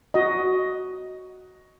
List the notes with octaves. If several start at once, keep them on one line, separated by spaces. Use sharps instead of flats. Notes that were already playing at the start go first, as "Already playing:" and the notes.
F#4 D#5